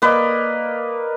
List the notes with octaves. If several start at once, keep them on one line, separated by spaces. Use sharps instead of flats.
A#3 B4 D5 D#5